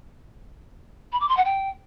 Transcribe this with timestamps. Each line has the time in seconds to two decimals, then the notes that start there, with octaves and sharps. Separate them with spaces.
1.12 B5
1.20 D6
1.29 C6
1.37 F#5
1.45 G5